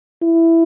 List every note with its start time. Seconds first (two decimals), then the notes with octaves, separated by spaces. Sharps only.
0.22 E4